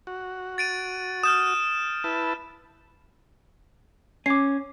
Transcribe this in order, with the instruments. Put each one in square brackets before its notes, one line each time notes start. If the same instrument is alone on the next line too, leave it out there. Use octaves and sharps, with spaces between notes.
[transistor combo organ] F#4
[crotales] A6 D7 D#7
[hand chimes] D#6 [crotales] F6 G6 E7
[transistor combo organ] E4 B4 A5
[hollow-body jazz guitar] C#4 [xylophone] D6 C7